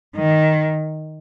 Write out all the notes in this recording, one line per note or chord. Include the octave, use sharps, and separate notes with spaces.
D#3